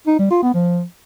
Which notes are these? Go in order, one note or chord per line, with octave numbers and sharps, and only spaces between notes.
D#4
G3
F4
B3
F3